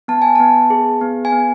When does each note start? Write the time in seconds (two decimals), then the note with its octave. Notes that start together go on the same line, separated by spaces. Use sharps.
0.08 B3 A5
0.22 G#5
0.35 B3 A5
0.70 G#4
1.01 B3
1.25 G#5
1.32 B3